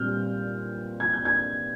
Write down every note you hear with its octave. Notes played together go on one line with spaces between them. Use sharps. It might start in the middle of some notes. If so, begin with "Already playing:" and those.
Already playing: A#2 G3 C4 F6 G6
G#6
G6
G#6